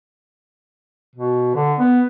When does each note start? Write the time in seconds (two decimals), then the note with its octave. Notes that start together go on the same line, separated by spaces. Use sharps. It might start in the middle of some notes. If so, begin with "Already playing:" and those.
1.16 B2
1.55 D3
1.79 B3